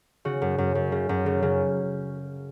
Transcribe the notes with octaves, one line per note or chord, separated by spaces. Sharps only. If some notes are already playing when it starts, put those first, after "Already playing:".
C#3 F#4
F#2
F#2
F#2
C#3
F#2
C#3
C#3